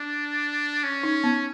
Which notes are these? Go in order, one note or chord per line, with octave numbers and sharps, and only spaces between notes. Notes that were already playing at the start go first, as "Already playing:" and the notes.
Already playing: D4
C#4
D#4
B3